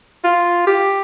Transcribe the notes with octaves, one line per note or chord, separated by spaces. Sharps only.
F4
G4